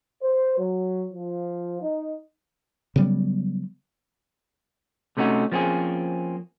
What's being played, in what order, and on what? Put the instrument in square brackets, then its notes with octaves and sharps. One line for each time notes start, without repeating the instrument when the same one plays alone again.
[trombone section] C5
F#3
F3
D#4
[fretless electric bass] C#3 F#3 G3 B3
[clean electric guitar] C3 A3 C#4 D#4 F#4
F3 A#3 C4 C#4 G#4